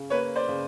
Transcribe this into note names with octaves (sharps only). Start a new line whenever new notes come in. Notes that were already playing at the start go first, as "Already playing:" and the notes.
Already playing: C#3
A#3 B4 C#5
C5 D5
C#3